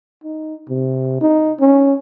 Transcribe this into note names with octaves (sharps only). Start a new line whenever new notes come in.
D#4
C3
D#4
C#4